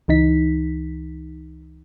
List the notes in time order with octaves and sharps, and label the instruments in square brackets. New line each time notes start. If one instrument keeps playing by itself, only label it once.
[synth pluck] C#2 E3 D#4 B6